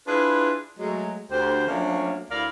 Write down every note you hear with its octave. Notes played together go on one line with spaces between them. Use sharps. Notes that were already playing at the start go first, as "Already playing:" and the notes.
D4 E4 F4 G#4 B4
F#3 G#3 A3
D2 G4 C5
F3 F#3 A3 A#3 C#4 D4
D2 E4 A#4 D5 F5